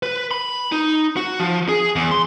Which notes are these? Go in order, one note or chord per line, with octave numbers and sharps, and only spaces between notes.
B4
B5
D#4
F#4
F3
G#4
E2
C6